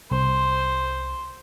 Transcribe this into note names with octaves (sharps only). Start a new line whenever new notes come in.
C2 C5